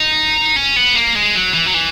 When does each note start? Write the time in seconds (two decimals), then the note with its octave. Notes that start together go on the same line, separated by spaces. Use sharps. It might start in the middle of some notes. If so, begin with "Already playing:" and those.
Already playing: D#4
0.56 C#4
0.76 B3
0.95 A#3
1.15 G#3
1.35 F#3
1.54 E3
1.66 F#3
1.74 E3